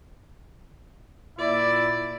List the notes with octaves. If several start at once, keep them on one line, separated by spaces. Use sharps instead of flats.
A#2 E4 D5